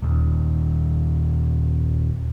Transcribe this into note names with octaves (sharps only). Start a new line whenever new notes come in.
D#1 D#2